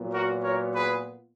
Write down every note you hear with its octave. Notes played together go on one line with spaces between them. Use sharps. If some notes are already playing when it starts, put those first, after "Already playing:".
Already playing: A#2 F#3 B3
F#4 A#4
A#4 C#5
G#4 B4